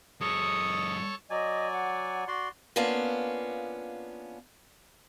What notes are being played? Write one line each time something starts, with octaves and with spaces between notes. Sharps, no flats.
F#2 G#3 A4 C#5 C#6 D#6
F#3 D5 D#5 G#5
F#5
F#4 D5 C6
A#3 B3 C#4 D4 F4